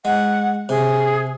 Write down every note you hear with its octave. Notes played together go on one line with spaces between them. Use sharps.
G#3 F#5
C3 G#4